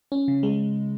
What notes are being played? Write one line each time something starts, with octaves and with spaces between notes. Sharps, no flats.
C#4
C#3
G#3